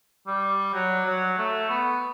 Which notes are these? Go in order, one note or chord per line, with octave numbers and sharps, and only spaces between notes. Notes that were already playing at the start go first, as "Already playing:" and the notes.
G3
F#3
F#3
A3
B3